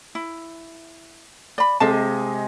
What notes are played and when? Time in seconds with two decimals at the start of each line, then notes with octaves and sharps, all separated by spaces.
0.15 E4
1.58 D5 B5
1.80 C3 G#3 A4 D#5 F5 A5